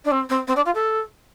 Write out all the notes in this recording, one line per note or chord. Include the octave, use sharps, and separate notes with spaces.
D4
C4
C4
C4
D4
F4
A4